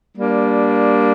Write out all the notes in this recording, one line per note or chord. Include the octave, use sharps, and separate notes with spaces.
G3 A#3 D4